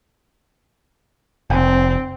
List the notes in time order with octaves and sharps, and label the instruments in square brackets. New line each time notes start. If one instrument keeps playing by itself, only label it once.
[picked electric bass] F1 [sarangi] C4